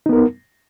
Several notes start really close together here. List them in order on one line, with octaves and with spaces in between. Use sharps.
D#4 B3 A#4